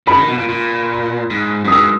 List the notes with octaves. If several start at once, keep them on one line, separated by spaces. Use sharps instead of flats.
C#3 B5
D#3
B2
A#2
A#2
G#2
F#2
D#6
G#2 E6